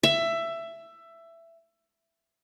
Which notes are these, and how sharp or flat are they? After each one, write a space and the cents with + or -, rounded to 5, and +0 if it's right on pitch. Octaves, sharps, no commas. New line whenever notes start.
E5 +15